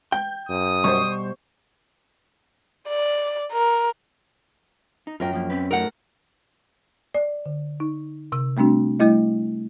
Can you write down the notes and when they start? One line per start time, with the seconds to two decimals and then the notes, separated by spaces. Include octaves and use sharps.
0.12 G5 G6
0.49 F#2 D#6
0.84 B2 G3 C5 C#6
2.88 D5
3.52 A#4
5.07 D#4
5.20 F#2 F4 A#4 G5
5.33 F3 A#3
5.50 C4 C#4 B4
5.71 A3 D#4 F#4 A#4 F#5
7.15 D5
7.46 D3
7.80 D#4
8.32 C3 E6
8.57 G3 A3 C4 D4 F#4
9.00 G3 A3 E4 D#5